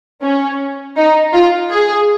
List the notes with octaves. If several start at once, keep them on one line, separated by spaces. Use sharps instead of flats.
C#4
D#4
F4
G#4